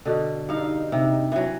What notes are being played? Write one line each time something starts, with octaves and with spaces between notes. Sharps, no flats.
B2 D3
G2 D#4 F5
C3
E3 F#3